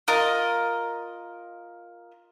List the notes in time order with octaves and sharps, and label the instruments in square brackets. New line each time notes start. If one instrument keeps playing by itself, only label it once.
[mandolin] F4 A#4 D#5